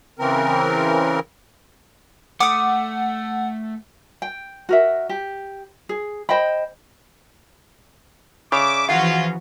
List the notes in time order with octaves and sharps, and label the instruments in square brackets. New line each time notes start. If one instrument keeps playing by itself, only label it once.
[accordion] C#3 E3 C4 A#4
[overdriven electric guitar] A3 [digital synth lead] F#5 [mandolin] D6 D#6
[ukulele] G5
F#4 A#4 E5
G4
G#4
C5 D#5 G5 B5
[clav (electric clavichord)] C#3 [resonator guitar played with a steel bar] C#5 D5 [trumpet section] E5 D6
[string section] E3 F3 F#4 [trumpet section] C#4 F4 [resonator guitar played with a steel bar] F5 F#5